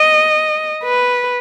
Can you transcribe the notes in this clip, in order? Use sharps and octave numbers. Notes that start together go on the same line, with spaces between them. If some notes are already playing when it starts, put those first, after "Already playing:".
Already playing: D#5
B4